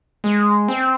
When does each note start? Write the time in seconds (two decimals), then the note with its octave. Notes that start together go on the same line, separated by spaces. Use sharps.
0.24 G#3
0.68 C4